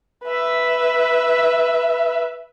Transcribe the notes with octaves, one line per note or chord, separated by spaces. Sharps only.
B4 E5